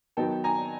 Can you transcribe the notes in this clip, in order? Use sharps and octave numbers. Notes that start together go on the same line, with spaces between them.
D#3 F#3 B3 D#4 G5 A5
G#5 A#5